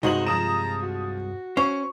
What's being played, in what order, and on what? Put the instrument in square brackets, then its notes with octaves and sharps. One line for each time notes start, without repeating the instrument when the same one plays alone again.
[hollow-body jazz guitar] C2 G2 G#3 [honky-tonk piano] D#4 C5 F#7 [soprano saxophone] F#4
[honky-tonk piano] F3 D#6 E7 [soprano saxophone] A#5
[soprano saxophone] F#4
[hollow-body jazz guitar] C#4 C5 [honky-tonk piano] C#6